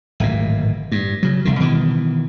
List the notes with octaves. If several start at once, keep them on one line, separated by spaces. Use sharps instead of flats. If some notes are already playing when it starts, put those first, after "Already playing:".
D1 G#1 A#2
G2
C#3 F#3
F1 C2 D3
B2 D#3 E3